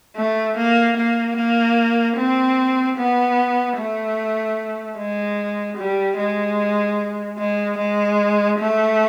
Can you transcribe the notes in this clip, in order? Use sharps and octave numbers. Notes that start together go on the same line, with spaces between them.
A3
A#3
A#3
A#3
C4
B3
A3
G#3
G3
G#3
G#3
G#3
A3